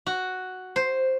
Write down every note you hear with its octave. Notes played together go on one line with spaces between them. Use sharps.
F#4
C5